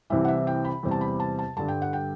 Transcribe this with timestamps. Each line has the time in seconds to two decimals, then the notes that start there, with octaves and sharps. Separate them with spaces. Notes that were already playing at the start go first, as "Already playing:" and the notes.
0.10 C2 C3 E3 E5
0.25 F#5
0.28 E5
0.47 G5
0.65 B5
0.83 E2 C3 G3
0.91 A5
1.01 B5
1.20 A5
1.39 A5
1.57 G2 D3 G3 A5
1.68 G5
1.82 F#5
1.93 G5